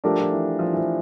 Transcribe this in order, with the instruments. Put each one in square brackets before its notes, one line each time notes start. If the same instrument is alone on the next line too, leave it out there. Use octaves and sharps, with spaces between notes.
[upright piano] F3 [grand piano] A3 D4 G4 A#4
[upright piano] F3
E3
F3
E3
F3